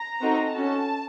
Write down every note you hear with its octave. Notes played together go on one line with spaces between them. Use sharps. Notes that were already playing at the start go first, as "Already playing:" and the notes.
Already playing: A#5
C4 D#4 F#4 A4
C#4 F#4 A4 A5